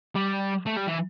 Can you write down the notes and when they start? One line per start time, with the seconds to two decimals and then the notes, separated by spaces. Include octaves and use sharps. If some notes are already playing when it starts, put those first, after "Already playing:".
0.15 G3
0.67 A3
0.77 G3
0.88 E3